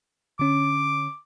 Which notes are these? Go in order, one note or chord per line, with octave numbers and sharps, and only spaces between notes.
D3 C#4 D6